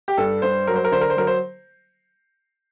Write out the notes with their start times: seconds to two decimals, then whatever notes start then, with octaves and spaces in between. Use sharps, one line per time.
0.08 G4
0.17 G2 A4
0.42 G2 C5
0.67 F#3 A#4
0.76 C5
0.84 A#4
0.92 D3 C5
1.01 A#4
1.10 C5
1.17 F#3 A#4
1.27 C5